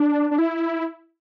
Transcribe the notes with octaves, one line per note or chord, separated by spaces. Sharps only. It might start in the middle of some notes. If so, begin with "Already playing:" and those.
Already playing: D4
D4
E4